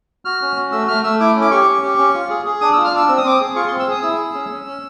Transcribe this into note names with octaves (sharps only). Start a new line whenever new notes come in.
F#4 F6
C#4
F#4
A3 E6
A3 F6
A3 E6
E4 D6
C#4
D6
G4 C#6
C#4
G4
C#4
F4
G#4
G#4
D4 D#6
E6
F4
F6
D4 E6
C4 E6
D#6
C4 D6
D#6
G#4
F4 C#6
C4 C6
E6
G#4 D#6
E4 E6
G#4
C#4
C#4
C#4